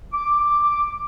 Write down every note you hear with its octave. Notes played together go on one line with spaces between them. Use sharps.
D6